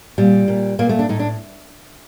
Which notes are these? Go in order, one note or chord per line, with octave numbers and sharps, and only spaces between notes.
A#2 G3
A#2
A#2 A#3
A3
D4
A2 D#4
D4